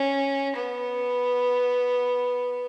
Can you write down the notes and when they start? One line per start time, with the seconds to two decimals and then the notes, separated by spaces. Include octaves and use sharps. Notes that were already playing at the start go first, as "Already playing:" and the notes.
Already playing: C#4
0.56 B3